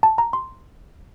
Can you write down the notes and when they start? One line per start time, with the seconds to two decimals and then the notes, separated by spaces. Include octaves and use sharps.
0.03 A5
0.18 A#5
0.33 C6